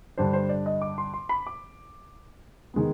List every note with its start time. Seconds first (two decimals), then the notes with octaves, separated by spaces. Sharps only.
0.18 G2 D3 G3 D4 C5
0.33 C5
0.49 D5
0.66 D#5
0.82 D6
0.98 C6
1.14 C6
1.29 B5
1.47 D6
2.74 D#3 G#3 B3